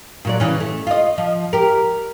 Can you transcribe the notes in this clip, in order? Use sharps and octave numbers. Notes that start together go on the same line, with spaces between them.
A#2 F#3 D5
C#3 E3 C#4
A3
F4 D#5
F3
G4 A#4